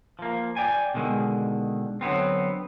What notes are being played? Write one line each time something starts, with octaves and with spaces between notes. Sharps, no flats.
F3 A#3
D5 G5 G#5
B2 D3 D#3 G#3
D3 F#3 B3 C4